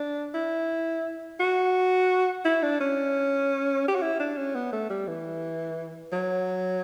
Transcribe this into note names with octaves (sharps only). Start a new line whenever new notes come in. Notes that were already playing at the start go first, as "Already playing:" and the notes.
Already playing: D4
E4
F#4
E4
D4
C#4
G4
F#4
E4
D4
C#4
B3
A3
G3
E3
F#3